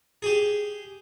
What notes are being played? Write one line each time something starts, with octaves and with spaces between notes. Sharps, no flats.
G4 G#4